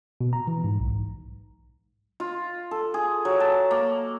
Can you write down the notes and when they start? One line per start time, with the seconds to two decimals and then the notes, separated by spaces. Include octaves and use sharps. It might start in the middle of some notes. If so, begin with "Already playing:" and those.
0.21 B2
0.33 A#5
0.47 E3
0.64 G#2
0.80 B1
2.20 F4
2.71 A4
2.94 G#4
3.25 F#3
3.40 A5
3.71 A#3